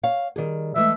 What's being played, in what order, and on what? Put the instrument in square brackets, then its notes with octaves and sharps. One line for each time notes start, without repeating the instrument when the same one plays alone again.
[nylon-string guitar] C#5 F5
D#3 G3 G#4
[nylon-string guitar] E3 G#3 A3 [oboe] E5